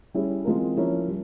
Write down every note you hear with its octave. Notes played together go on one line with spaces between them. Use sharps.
G3 C#4 E4 G#4
E3 G#3 C4 F4 A#4
F3 A#3 C#4 E4
G3